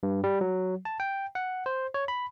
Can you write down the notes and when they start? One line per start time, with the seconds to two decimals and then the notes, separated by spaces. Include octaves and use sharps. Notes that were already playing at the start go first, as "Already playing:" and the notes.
0.03 G2
0.24 G3
0.41 F#3
0.85 A5
1.00 G5
1.35 F#5
1.66 C5
1.94 C#5
2.08 B5